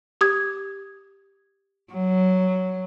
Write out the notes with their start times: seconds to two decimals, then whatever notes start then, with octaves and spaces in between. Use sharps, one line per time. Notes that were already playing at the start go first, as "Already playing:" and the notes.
0.21 G4 D#6 G#6
1.93 F#3